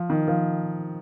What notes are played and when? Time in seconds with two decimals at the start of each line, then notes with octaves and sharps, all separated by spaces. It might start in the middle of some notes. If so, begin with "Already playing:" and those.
Already playing: F3
0.10 D#3
0.28 F3